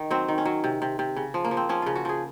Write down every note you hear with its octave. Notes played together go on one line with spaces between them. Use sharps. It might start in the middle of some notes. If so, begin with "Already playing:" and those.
Already playing: D#3
F#3 C4
D#3
C#4
F#3
C3
C3
C3
C#3
F3
A#3
F3
C4
F3 C#4
C#3 F4
F#4
F3 G#4